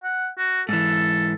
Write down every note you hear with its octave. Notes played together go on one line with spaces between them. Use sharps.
F#5
F#4
G#2 E3 A4